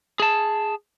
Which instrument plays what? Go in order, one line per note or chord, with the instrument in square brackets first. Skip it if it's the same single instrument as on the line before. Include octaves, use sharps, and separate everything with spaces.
[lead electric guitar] G#4 A5